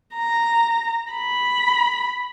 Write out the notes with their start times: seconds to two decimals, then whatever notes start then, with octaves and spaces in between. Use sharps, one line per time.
0.16 A#5
1.13 B5